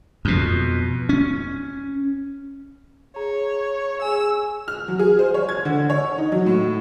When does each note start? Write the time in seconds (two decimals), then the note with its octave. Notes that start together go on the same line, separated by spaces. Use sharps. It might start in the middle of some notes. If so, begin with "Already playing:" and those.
0.25 F2 B2
1.09 C#4
3.16 G#4 C#5 A#5
4.02 G#4 G#5 E6
4.68 F6
4.88 F#3
4.99 G#4
5.19 C5
5.34 C#5
5.49 G#6
5.65 D3
5.90 C#5
6.18 D#4
6.32 F#3
6.46 A2